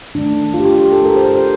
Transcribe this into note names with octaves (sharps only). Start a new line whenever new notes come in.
D#3 A3 D4
F4
G4
F4
G4
A4
A#4
C5
C5